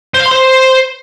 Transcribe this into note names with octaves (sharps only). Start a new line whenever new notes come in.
C5
F5
C6
C5